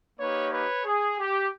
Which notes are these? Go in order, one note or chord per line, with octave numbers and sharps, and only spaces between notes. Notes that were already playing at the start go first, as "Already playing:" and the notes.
A#3 D#4 G4 B4 C#5
B4 C#5
G#4
G4